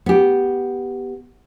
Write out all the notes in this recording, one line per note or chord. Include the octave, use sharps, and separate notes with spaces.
B3 G4